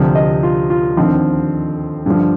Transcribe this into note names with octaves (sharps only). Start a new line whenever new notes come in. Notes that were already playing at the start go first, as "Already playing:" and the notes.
Already playing: D2 C3 F3
D#5
F4
F4
D#2 D3 F3 C4
G2 D3 F3